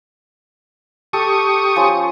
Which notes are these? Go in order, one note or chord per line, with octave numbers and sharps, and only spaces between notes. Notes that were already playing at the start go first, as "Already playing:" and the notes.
G4 A4 C#6 D#6
F3 C#4 C6